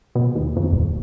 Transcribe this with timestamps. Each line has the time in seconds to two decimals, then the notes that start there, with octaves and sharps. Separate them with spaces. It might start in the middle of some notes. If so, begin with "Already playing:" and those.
0.15 B2
0.35 D#2
0.56 F2
0.72 D#1